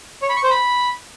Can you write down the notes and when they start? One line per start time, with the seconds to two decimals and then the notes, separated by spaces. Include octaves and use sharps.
0.22 C#5
0.29 B5
0.36 C#6
0.44 C5
0.51 B5